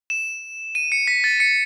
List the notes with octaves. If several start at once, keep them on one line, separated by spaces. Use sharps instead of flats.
E7
D#7
C#7
B6
A6
C#7